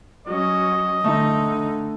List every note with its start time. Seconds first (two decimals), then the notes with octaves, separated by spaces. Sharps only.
0.27 F#3 C#4 D#5
1.04 D3 A3 D#4